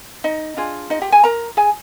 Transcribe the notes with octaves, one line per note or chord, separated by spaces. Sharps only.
D#4 D#5
D4 F4 G#4
D#4 D#5
G4 G5
G#4 G#5
A#4 A#5
G#4 G#5